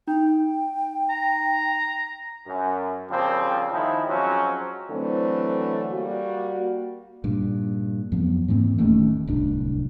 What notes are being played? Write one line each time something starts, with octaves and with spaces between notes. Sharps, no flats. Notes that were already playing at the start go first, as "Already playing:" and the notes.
D#4 G5
A#5
F#2
C#3 F3 G3 A#3 C4
D#3 F3 G#3 D#4 E4
F3 F#3 G#3 C4 C#4
D3 E3 F#3 A3 C4
G3 A#3 F#4
G2 A#2
F2 F3 F#3 B3
G#2 E3 A#3 C4
D1 D#2 A3 C#4
D1 C2 D4